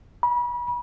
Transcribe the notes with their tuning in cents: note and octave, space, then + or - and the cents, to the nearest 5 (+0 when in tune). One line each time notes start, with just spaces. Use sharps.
B5 -35